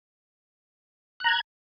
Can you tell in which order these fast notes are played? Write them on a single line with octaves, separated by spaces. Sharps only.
F#6 A#5 G#6